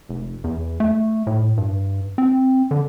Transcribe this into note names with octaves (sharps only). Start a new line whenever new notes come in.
F1
E2
A3
A2
G2
C4
D3